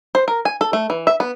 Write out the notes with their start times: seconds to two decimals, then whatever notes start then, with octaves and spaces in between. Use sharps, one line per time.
0.15 C5
0.28 A#4
0.45 G#5
0.61 A4
0.73 A3
0.90 E3
1.07 E5
1.20 B3